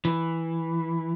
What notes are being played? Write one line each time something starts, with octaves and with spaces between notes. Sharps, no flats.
E3